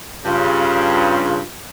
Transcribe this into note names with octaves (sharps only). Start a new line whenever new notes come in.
G2 C#3 F4